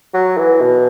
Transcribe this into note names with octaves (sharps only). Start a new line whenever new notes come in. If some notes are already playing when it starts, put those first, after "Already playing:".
F#3
E3
B2